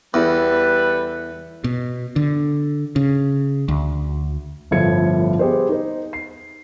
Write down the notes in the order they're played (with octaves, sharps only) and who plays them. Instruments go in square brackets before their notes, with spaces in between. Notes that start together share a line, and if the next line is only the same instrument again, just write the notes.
[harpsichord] E2 [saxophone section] G3 A4 B4
[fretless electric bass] B2
D3
C#3
D2
[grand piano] G1 A2 F3 E4 G#6 C#7
B3 G4 G#4 C5
D#4 C5
C7